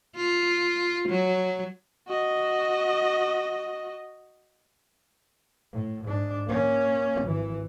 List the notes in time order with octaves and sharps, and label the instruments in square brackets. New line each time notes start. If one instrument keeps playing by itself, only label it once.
[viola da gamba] F4
F#3
[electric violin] F#4 D#5
[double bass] A2
G#2 D4
A#3 C#4
G#1 E3